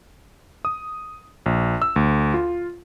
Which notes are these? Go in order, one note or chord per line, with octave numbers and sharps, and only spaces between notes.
D#6
A#1
E6
D2
F4